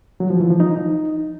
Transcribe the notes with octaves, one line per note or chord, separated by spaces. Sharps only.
F#3
F3
E3
F3
D#4